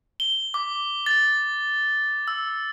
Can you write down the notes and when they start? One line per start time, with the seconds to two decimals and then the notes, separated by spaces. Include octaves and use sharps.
0.20 G7
0.54 D6
1.06 A6
2.28 E6